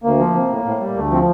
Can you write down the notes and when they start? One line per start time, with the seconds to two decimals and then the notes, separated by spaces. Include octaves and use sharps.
0.04 D2 A#3
0.19 F3
0.34 C3
0.50 A2
0.65 A2
0.80 G3
0.96 D2 A3
1.11 F3 C4